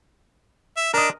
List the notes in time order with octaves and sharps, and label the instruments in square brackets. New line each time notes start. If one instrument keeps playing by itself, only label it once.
[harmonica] E5
[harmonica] D4 [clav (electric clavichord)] A#4 D#5